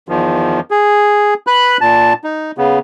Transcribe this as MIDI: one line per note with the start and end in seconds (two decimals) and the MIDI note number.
0.09 0.60 40
0.09 0.60 51
0.09 0.60 53
0.71 1.34 68
1.47 1.77 71
1.47 1.77 83
1.47 1.77 90
1.81 2.13 46
1.81 2.13 81
2.24 2.51 63
2.58 2.79 49
2.58 2.79 59